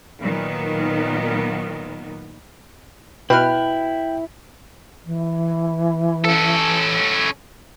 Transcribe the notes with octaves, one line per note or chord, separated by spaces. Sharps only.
A#2 D#3 F#3 B3
B2 E4 B4 G5 F6
E3
C#4 A4